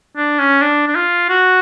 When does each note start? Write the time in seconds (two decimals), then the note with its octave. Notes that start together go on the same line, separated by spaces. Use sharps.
0.16 D4
0.39 C#4
0.61 D4
0.87 D4
0.95 F4
1.29 F#4